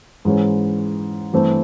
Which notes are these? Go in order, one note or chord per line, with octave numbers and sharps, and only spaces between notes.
G#2 E3 G#3 C#4
G2 E3 A3 C4